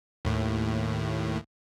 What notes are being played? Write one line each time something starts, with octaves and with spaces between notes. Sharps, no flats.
D#2 A2